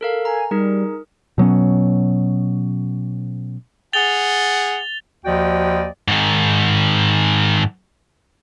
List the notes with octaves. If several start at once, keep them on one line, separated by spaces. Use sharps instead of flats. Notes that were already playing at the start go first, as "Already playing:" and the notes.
A4 A#4 F5
G#5 A#5
G3 D#4 G#4 A#4
B2 F#3 B3 C#4
G#4 F#5 A6 F7 G7
D#2 F3 F#4 D5 D#5 G5
G#2 D#3